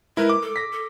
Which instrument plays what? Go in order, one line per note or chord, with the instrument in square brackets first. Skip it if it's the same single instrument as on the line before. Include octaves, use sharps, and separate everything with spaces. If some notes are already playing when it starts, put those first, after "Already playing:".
[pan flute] G#3 [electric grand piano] E4 A#4 B4
[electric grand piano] D6
[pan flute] A4
[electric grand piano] A#6 B6
[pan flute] A4